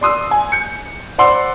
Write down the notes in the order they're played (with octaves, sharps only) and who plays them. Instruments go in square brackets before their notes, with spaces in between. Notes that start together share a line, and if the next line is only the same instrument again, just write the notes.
[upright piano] D5 C6 D#6 E6
G#5
G6 C#7
C5 D5 F#5 B5 C6 E6